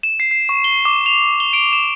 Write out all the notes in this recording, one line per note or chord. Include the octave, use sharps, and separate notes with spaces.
E7
C7
C7
C#6
G7
D6
F7
G7
D7
E7